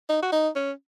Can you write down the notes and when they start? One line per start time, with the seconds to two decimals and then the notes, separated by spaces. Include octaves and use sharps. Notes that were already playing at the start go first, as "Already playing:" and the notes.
0.09 D#4
0.23 F#4
0.33 D#4
0.56 C#4